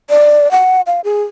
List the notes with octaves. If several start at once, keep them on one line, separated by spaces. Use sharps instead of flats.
D5
F#5
F5
G#4